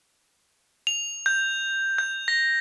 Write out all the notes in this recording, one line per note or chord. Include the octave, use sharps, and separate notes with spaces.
F7
G6
G6
A#6